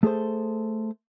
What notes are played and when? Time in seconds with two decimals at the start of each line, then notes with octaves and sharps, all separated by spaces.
0.03 A3 G#4 A4 C5